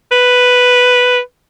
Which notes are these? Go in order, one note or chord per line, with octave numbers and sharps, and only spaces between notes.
B4